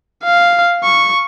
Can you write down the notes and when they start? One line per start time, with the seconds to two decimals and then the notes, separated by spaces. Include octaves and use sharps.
0.24 F5
0.84 C#6